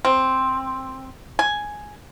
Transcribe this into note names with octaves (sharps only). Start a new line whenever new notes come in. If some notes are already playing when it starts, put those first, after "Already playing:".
C4
G#5